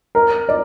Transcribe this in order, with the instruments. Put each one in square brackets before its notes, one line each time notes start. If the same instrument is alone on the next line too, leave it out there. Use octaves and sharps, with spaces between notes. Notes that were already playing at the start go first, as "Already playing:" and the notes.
[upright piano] A#4
D5